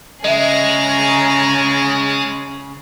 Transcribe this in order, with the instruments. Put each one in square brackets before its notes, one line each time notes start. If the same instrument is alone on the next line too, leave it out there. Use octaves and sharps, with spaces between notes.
[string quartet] C#3 [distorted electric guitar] G#3 [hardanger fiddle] G#4 A#5 [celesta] D#5 E5